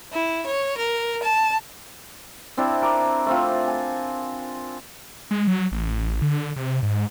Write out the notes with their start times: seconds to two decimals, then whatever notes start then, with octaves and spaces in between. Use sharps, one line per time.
0.13 E4
0.47 C#5
0.77 A#4
1.23 A5
2.57 C4 D4 E4 A5
2.82 A#4 D6
3.26 A3 C4 F4
3.68 G#5
5.31 G#3
5.47 F#3
5.72 A1
6.22 D3
6.56 C3
6.83 G#2